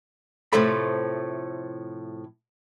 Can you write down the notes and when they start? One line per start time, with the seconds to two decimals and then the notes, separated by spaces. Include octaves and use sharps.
0.53 A2 C3 F3 A3 A4 B5